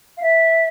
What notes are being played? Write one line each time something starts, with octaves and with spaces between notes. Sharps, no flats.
F5
E5